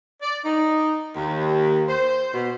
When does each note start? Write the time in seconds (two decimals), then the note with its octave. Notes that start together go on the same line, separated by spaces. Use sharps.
0.22 D5
0.45 D#4
1.16 D#2
1.89 C5
2.34 B2